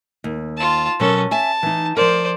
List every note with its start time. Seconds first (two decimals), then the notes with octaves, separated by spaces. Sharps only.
0.24 D#2
0.57 F4 A5
1.00 B2 F#3 C#4 A4 A#4
1.31 E5 G#5 A5
1.63 E3 D#4
1.97 F3 A#4 C5 D5